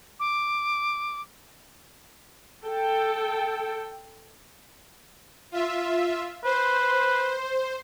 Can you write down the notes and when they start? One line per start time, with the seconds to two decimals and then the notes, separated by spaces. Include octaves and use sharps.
0.20 D6
2.65 A4 G5
5.52 F4 E5
6.44 B4 C5